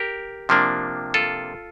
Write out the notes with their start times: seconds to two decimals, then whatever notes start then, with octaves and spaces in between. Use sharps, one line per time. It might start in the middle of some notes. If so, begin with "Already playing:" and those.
Already playing: G4 A#4
0.49 C3 F3 A#3 D4
1.14 F4 A4